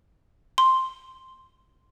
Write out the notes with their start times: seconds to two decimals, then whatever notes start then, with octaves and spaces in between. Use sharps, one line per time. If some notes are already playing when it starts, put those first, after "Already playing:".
0.58 C6